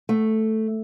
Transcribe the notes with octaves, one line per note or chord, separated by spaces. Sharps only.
A3